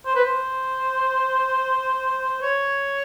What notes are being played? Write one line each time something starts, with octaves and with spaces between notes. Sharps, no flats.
C5
B4
C5
C#5